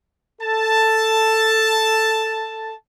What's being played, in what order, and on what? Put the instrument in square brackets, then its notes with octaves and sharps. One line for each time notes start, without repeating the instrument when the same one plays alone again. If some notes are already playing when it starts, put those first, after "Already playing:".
[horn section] A4 A5